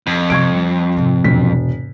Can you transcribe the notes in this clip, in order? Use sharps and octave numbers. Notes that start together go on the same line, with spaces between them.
F2
G2 C3 C#6 G#6 D7
G3
G#2 C3
E1 B6